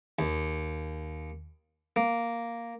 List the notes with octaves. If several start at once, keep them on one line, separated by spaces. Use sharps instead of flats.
D#2
A#3